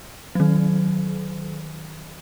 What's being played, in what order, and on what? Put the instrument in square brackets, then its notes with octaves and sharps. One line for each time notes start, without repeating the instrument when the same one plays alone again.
[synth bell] D#3 F#3